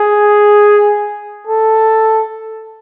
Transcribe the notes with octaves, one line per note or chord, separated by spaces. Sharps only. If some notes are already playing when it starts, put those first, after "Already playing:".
Already playing: G#4
A4